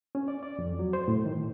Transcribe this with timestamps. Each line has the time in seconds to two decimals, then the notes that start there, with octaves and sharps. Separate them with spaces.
0.15 C#4
0.28 D5
0.43 D5
0.59 F2
0.79 F#3
0.93 C5
1.08 A2
1.25 D#3
1.40 A2